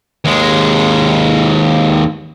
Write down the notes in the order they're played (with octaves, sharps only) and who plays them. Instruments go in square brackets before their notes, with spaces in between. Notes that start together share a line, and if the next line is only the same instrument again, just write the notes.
[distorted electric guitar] D#2 G#3